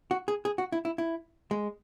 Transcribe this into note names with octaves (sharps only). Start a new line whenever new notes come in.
F#4
G#4
G#4
F#4
E4
E4
E4
G#3